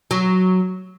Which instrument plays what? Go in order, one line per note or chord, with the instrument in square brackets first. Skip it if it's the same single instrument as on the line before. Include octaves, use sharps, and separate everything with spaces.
[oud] F#3